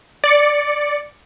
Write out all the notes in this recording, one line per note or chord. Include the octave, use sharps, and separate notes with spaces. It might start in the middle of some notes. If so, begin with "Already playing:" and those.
D5 C#7